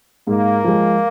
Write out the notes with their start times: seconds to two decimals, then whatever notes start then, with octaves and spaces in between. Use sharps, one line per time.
0.27 G#2 A#3
0.64 F3 G#3